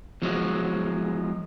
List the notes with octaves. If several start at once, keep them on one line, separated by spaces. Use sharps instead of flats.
E2 F3 F#3 G#3